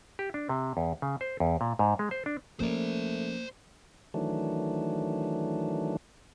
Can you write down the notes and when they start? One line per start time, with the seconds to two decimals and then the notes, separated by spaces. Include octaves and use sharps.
0.19 G4
0.34 D4
0.49 C3
0.77 E2
1.02 C#3
1.21 C5
1.40 E2
1.61 A#2
1.79 G#2
1.99 G#3
2.11 C5
2.26 D4
2.60 F3 A3 A#3 C#4 A#4 C5 D5
4.14 D#3 E3 F#3 A3 D4